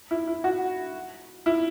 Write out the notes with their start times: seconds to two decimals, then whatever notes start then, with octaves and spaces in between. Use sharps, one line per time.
0.11 E4
0.27 E4
0.44 F#4
1.46 E4